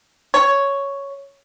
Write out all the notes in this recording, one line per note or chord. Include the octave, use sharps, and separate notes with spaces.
C#5